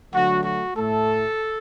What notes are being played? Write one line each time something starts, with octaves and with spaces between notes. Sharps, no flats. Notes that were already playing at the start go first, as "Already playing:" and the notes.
D3 F#3 A3 F#4
F#4
A2 A3 A4